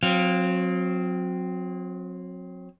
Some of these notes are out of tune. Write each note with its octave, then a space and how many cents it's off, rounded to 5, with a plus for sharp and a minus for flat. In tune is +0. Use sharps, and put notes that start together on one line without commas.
F#3 -35 C4 +0 F5 +0